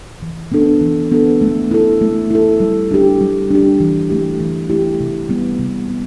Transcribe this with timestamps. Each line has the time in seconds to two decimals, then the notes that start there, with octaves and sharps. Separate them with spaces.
0.22 E3
0.52 B3 D4 A4
0.81 E3
1.11 B3 D4 A4
1.41 A3
1.71 E4 A4
2.01 A3
2.30 E4 A4
2.60 G3
2.91 D4 G4
3.21 G3
3.51 D4 G4
3.80 E3
4.10 A3 E4 G4
4.40 E3
4.69 A3 E4 G4
5.00 C3
5.29 G3 B3
5.59 C3
5.90 B3